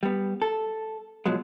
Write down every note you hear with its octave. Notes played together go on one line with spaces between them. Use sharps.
G3 B3
A4
B2 F3 F#3 G#3